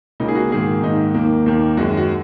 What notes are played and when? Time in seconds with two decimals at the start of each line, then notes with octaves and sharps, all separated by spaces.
0.20 C#2 C#3 A#3 D#4
0.28 G#4
0.35 F#4
0.52 G#2 D#3 A#3 G#4
0.82 G#2 D#3 A#3 D#4
1.14 D#2 D#3 A#3
1.46 D#2 D#3 A#3
1.77 F#2 D#3 G#3 F#4
1.97 F#4